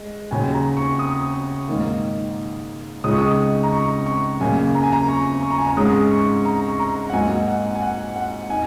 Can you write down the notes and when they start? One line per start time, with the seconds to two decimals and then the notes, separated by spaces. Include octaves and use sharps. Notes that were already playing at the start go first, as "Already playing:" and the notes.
Already playing: G#3
0.31 D#2 C#3 F#3 G#5
0.54 A#5
0.77 C#6
0.99 D#6
1.68 G#2 D#3 A#3
3.04 C#2 C#3 G#3 D#4 D#6
3.11 C#6
3.18 D#6
3.63 A#5
3.72 C#6
4.06 C#6
4.40 F#2 C#3 A#3 G#5
4.75 A#5
4.83 G#5
4.93 A#5
5.08 C#6
5.43 C#6
5.51 A#5
5.58 G#5
5.67 A#5
5.77 G#2 G#3 C#4 D#6
6.11 C#6
6.45 A#5
6.68 C#6
6.80 A#5
7.10 F#5
7.13 G#2 F#3 A#3 D#4 G#5
7.48 F#5
7.75 G#5
7.82 F#5
8.16 F#5
8.50 D#4 G#5